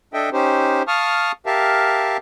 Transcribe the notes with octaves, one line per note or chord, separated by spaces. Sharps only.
D4 A4 D#5 E5 G5
C#4 D#4 G4 C5
F5 A5 C#6 D#6 F6
G4 A#4 E5 F5 A5